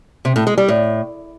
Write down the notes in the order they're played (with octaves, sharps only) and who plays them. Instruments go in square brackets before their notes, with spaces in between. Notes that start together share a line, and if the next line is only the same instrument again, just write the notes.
[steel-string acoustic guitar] C3
A2
G#3
G3
A2